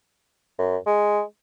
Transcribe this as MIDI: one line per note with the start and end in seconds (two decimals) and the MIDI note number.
0.58 0.77 42
0.86 1.21 56